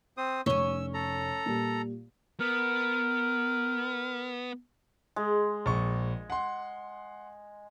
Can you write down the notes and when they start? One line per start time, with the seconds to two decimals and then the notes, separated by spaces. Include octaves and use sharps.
0.17 C4 C5 D#6
0.46 F1 C#4 C#5 E6 G7
0.94 A4 A#5
1.46 A#2 G3
2.40 B3 A#4
5.16 G#3
5.66 A#1 C#6
6.30 F#5 C6